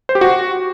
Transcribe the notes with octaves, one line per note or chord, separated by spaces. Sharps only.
C5
G4
F#4